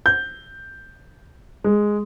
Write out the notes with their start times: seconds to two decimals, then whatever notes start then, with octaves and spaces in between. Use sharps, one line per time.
0.06 G6
1.64 G#3